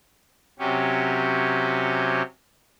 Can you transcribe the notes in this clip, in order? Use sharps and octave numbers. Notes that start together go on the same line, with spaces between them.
C3 F#3 C#4 G4